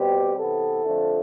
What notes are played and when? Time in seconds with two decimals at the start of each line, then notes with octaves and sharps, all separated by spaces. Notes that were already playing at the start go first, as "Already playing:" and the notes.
Already playing: B2 G3 C4 G4
0.37 C3 E3 B3 A4
0.86 F2 D3 F3 A3